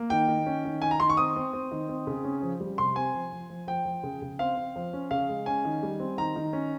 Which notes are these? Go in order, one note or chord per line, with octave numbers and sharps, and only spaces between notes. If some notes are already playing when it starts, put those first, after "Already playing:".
Already playing: A#3
D#3 G5
D#3
C#4
D#3
D#3 G#5
A#5
D#3 C6
C#6
C4 D#6
C4
C4
D#3
C4
C#3
C#4
F3
G3
C3 C6
C4 G#5
F3
F3
F3
F3 G5
F3
C#3
C#3
C4 F5
C4
F3
C#4
C#3 F5
G#3
C#4 G#5
D#3
G3
C4
D#3 A#5
D#3
C#4